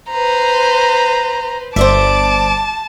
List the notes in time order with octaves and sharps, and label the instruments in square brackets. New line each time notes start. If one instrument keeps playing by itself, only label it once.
[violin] B4 C5 [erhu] A#5
[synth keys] G1 [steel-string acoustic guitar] C5 D5 E5 [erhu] A5 [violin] D6